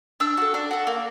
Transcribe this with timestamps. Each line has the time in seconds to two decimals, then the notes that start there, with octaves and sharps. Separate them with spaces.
0.20 D4 E6
0.37 F#4 A4
0.54 D4
0.71 F#4 A4
0.87 A#3